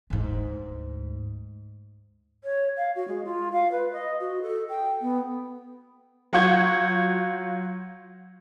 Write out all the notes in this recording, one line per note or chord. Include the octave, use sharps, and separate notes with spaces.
D2 G#2
C#5
F5
F#4
G#3
F4
F5
B4
D#5
F#4
A4
G5
B3
F#3 F4 F#5 C#6 G6 G#6